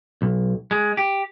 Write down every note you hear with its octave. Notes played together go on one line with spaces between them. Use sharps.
B1
G#3
G4